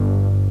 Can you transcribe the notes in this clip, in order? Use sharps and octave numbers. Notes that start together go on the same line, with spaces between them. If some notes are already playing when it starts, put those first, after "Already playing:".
Already playing: G1 G2